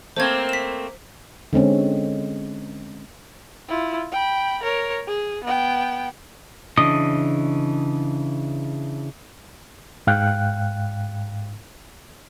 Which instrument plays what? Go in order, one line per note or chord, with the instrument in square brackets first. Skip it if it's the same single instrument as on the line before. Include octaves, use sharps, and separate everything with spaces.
[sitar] A3 A#3 C4 [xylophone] C5 G#6
[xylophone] B6 E7
[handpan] D3 G#3 C4 C#4
[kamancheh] E4 F4
G5 B5
A#4 C#5
G#4
B3 G5
[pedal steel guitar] C#3 E3 D4 D#5 D#6
[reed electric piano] G#2 F5 G5 F#6